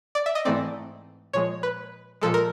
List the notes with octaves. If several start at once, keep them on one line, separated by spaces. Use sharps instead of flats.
D5
E5
D#5
G#2 E3 A3 C4 D5
A#2 F3 G#3 C#5
B4
A#2 F3 G#3 A4
A#4